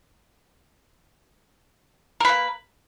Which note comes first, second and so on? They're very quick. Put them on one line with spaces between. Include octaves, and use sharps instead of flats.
A#4 B4 A#3